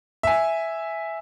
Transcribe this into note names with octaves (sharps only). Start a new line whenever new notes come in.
E5 G#5